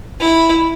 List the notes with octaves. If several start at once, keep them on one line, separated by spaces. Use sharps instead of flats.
E4